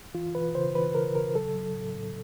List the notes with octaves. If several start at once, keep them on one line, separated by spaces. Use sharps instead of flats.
E3 F4
E3 B4
C#3 C5
E3 B4
C#3 A#4
C#3 A#4
F#3 A4
F#3
A2
A2